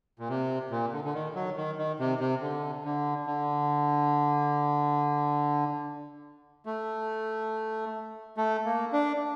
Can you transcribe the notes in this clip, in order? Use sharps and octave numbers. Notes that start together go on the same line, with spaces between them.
A#2
C3
A#2
D3
D3
D#3
F#3
D#3
D#3
C3
C3
D3
D3
D3
A3
A3
A#3
D4